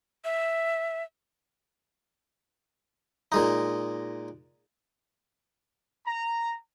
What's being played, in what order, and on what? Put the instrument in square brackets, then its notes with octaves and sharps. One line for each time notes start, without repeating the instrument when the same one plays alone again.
[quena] E5
[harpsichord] A#2 G#3 D#4
[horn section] A#5